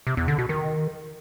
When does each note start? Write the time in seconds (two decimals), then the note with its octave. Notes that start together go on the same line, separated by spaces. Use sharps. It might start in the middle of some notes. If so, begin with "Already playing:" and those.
0.07 C3
0.17 E2
0.28 D3
0.39 B2
0.49 D#3